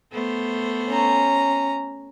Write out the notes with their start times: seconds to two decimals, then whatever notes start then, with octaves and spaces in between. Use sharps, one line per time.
0.13 A3 B3 C5
0.89 C#4 A#5